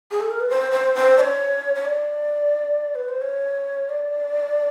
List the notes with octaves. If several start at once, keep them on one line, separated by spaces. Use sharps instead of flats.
G#4
A4
A#4
B4
C5
C5
C5
D5
C#5
C#5
D5
B4
C5
C#5
D5